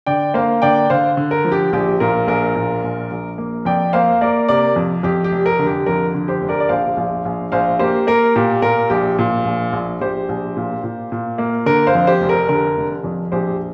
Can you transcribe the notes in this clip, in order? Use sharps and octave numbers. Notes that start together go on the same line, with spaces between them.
D3 D5 G5
A#3 C5 F5
D3 D5 G5
D3 C5 F5
D3
A#4
F3
G4
A#1 G4
A#2 A#4
A#1 A#4
A#2
A#1
A#1
A#3
F2 D5 G5
A#3 C5 F5
A#3 A#4 D5
C3 A#4 D5
F2
F2 G4
G4
F1
A#4
D3
G4
F2 A#4
D3
G4 C5
F1
A#4 D5
D5
A#1 C5 F5
A#1
A#1
A#1 C5 F5
A#3 G4 C5
A#3 A#4
A#2 G4
A#2 A#4
A#1 G4
A#2
A#1
A#1
A#1 G4 C5
A#1
A#2
A#2
A#2
A#3
D3 A#4
C5 F5
F2
G4 C5
F1
A#4
D3 A#4
F1
F2
A#1 G4 C5